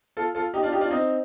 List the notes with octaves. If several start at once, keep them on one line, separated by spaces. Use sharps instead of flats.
F4 A4
F4 A4
D#4 G4
D4 F4
D#4 G4
D4 F4
C4 D#4